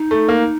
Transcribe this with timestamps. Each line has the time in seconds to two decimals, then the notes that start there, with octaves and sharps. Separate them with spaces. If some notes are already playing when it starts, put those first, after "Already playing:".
Already playing: D#4
0.11 A3
0.29 A#3